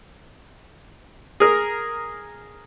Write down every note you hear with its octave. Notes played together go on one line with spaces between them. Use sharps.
G#4 A#4